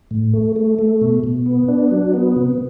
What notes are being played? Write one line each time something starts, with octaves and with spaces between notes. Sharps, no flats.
A2
A3
A3
A3
B2
B2
B3
D4
F#3
B3
C3